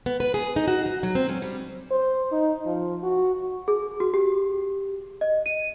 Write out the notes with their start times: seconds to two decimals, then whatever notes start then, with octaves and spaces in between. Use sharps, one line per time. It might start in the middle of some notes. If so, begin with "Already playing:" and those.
0.06 B3
0.20 B4
0.34 G#4
0.56 D#4
0.68 F#4
0.86 F#4
1.03 F#3
1.15 C4
1.29 C#4
1.42 G3
1.91 C5
2.32 D#4
2.66 F3
3.03 F#4
3.68 G#4
4.00 F#4
4.14 G4
5.21 D#5
5.46 D#7